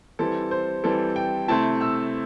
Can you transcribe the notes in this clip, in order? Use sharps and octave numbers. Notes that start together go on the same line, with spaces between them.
E3 G3 C4 E4 A4
C5
E3 G3 C4 E4 A4
G5
C3 A3 C4 E4 A5
E6